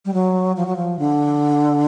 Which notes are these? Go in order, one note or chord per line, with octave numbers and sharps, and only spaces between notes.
G3
F#3
F3
F#3
F3
D3